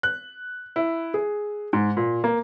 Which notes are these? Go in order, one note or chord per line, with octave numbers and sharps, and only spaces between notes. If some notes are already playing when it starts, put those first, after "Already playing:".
F#6
E4
G#4
G#2
A#2
A#3